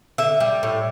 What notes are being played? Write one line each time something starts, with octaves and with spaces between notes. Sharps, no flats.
D3 E5
G3
A2